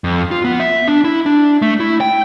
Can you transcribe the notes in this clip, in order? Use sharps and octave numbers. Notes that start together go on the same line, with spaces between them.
F2
F4
B3
E5
D4
E4
D4
A3
E4
G5